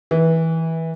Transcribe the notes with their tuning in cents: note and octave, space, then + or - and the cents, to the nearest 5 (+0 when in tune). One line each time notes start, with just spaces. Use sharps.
E3 -20